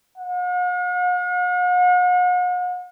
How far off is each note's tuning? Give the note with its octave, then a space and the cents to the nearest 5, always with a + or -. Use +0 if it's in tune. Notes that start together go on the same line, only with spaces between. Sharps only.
F#5 -45